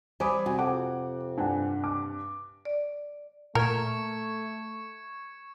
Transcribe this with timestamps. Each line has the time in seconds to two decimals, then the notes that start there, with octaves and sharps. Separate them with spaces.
0.20 G3 C5 G#5 B5 D6 D#6
0.46 C3 F#4 G#5
0.59 F2 F#5 D6
1.38 G2 D4 F#5 G#5
1.84 D6
2.65 D5
3.55 A#2 A3 A#4 C#6 G#6 C#7